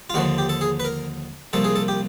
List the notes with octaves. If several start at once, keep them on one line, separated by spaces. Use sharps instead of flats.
F4
D#2 D3 F3 F#4
G4
A4
G#4
B4
A#4
C2 A#2 F3 A4
G#4
A4
G4